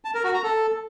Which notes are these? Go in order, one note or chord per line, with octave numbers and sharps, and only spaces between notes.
A5
A#4
F#4
A#5
A4